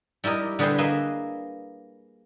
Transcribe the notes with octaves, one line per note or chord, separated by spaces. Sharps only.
G3 E4 G4 A#4 D#5
D3 G3 G#4 B4 C5 G5
A#3 G#4 B4 D#5 E5